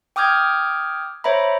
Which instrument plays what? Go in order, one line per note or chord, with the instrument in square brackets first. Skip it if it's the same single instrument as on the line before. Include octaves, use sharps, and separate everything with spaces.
[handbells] G5 D6 D#6 F6 G6 G#6
C5 C#5 E5 A#5 B5